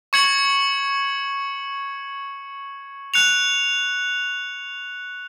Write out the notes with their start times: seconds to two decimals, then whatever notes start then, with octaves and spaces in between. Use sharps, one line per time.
0.13 C#6 G#6 C#7 F#7
3.14 F#6 C#7 F7